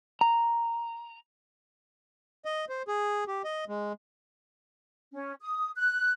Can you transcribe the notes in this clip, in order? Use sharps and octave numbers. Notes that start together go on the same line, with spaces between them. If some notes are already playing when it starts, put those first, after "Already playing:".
A#5
D#5
C5
G#4
G4
D#5
G#3
C#4
D#6
F#6